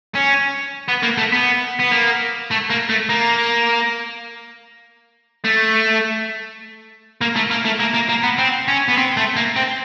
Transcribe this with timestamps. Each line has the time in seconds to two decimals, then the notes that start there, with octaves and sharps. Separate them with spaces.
0.15 C#4
0.89 B3
1.03 A#3
1.18 A3
1.33 B3
1.80 B3
1.92 A#3
2.51 A3
2.70 A#3
2.90 A3
3.10 A#3
5.45 A3
7.21 A#3
7.36 A3
7.51 A#3
7.65 A3
7.80 A#3
7.94 A#3
8.09 A#3
8.23 B3
8.38 C4
8.68 C#4
8.88 B3
8.97 C4
9.17 A3
9.36 A#3
9.56 C4